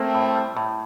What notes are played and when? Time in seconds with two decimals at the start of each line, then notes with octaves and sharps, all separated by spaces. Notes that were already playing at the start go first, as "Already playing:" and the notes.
Already playing: A3 A#3 C4
0.15 A2
0.35 G3
0.57 A2